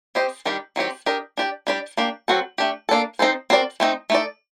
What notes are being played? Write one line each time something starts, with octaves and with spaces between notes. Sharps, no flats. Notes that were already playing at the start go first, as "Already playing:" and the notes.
C4 G4 C5 D#5
D#3 G3 D4 G4 A#4
D#3 F#3 C4 G4
D4 G4 A#4 D#5
D4 G4 D5
G3 D4 G4 D5
A#3 D4 G4
F#3 C4 F#4 A4
A3 D4 G4
A#3 D4 A4
C4 D#4 A4 C5
C4 F#4 A#4 D5
A3 C4 D#4
A3 D#4 A4 D5